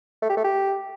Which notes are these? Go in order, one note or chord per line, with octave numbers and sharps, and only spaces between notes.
A3
G4
A3
G4